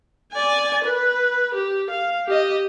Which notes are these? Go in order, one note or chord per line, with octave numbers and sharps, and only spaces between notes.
D5 G#5
B4
G4
F5
G4 D#5